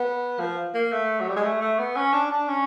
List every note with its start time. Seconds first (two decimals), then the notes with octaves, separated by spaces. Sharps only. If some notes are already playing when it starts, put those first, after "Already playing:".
Already playing: B3
0.40 F3
0.74 A#3
0.92 A3
1.21 F#3
1.29 G3
1.36 G#3
1.44 A3
1.61 A3
1.79 B3
1.96 C#4
2.13 D4
2.31 D4
2.48 C#4